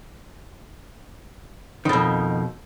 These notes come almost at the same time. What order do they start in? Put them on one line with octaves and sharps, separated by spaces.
D#3 B2 F2